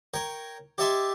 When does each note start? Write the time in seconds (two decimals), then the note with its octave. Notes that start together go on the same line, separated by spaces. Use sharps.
0.14 A#4 C#5 G5
0.78 G4 C#5 D#5 E5 A5 C6